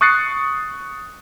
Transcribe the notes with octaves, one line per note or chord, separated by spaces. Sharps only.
C#6 D#6 F#6 A6 C7 C#7